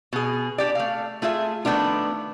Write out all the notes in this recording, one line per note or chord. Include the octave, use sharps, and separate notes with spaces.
B2 G#4
D4 G4 D5
A3 F5
A3 F4 G#4 E5
D#3 F3 A3 B3 D4 F4